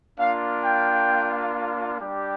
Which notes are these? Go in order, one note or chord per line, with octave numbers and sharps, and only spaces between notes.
A#3 D4 F4 F5
G5
G3 D4 G4